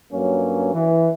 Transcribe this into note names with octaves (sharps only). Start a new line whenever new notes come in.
G2 F#3 A#3 C#4
E3